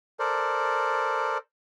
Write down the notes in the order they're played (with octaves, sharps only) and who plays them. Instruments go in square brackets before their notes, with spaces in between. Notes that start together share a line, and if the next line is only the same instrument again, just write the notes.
[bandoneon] A4 A#4 C5 D5